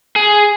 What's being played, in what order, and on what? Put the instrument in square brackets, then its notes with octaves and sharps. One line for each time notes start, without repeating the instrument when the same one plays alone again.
[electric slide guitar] G#4